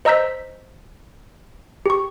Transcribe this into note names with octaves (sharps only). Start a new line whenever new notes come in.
C5 D#5 A#5 E6 G6 B6
G4 C#6